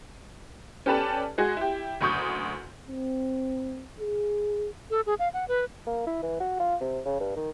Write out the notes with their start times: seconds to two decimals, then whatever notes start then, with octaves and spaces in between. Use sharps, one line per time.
0.86 C#4 G4 A4 B4 D5 A5
1.38 G#3 F#4 G#4
1.57 E4 G4
2.01 F#1 D2 C#6 D#6 G6
2.88 C4
4.00 G#4
4.90 A4
5.06 G#4
5.19 F5
5.34 F#5
5.48 B4
5.86 A#3
6.07 E4
6.23 E3
6.40 F#4
6.60 F4
6.81 C3
7.05 C#3
7.20 G2
7.36 D#3